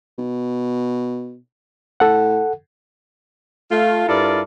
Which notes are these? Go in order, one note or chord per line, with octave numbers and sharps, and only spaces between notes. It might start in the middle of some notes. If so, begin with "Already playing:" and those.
B2
A2 A4 F#5
A3 F4 F5
G2 E4 F4 A4 A#4 D5